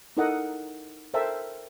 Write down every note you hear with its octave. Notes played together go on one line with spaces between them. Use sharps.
D#4 E4 A4 A#4 D#5 F#5
A4 A#4 C5 E5 G5 A5